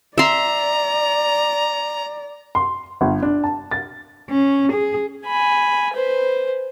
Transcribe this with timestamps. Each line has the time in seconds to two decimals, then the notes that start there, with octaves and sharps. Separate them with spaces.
0.18 D5 E5 A#5 C6
2.55 C6
3.01 G1
3.23 D4
3.44 A5
3.71 A6
4.30 C#4
4.73 G#4
5.26 G#5 B5
5.94 B4 C5